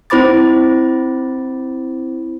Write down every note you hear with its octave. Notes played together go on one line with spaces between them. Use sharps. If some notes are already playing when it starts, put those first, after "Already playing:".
C4 E4 C5 B5 D6 A6